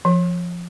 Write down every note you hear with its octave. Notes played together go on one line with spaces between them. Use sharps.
F3